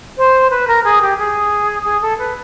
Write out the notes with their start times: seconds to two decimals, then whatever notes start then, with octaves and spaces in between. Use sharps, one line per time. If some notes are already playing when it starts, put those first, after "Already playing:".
0.18 C5
0.50 B4
0.68 A#4
0.84 G#4
1.02 G4
1.18 G#4
1.85 G#4
2.02 A4
2.19 B4